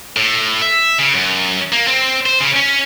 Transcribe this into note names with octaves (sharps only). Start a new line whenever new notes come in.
A2
E5
C#3
F#2
A#3
C4
C5
C#3
C#4